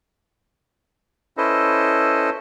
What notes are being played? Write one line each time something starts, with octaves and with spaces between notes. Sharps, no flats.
C#4 E4 A4 B4 C5 D#5